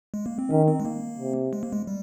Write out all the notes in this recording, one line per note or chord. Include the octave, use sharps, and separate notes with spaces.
G#3
A#3
C4
D#3 C#4
C4
G#3
A#3
C3
G#3
A#3
G#3
G3